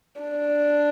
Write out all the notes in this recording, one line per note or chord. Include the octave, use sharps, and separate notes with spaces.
D4